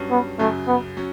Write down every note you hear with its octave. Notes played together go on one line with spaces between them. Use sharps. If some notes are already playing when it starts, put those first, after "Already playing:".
Already playing: G2 F#3 C#4
B3
F#2 C#3 F#3 A3
B3
F#3 C#4